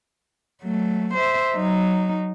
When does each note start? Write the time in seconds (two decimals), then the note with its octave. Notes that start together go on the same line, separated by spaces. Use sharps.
0.63 F#3 A3
1.14 C5 E5
1.55 F#3 D#4